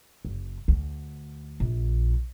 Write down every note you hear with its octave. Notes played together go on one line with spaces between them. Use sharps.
F#1
D2
A#1